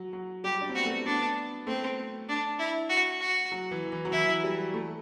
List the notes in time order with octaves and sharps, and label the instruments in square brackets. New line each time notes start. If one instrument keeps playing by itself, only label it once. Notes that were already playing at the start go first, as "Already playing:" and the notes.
Already playing: [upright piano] F#3
F#3
[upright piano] G3 [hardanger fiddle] G4
[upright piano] D4
C4
[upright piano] B3 [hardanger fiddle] F#4
[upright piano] A3
[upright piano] B3 [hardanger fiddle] D4
[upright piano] A3 [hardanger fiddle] C4
[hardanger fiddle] D4
E4
F#4
F#4
[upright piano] F#3
E3
E3
F#3
[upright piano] E3 [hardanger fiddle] E4
[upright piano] G3
A3